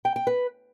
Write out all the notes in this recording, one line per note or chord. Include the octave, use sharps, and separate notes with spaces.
G5
G5
B4